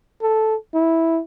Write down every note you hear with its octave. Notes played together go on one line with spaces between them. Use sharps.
A4
E4